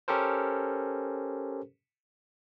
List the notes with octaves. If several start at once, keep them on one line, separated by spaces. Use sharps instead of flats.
C#4 G4 A4 A#4 C5